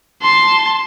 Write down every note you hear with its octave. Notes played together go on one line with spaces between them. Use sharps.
A5 C6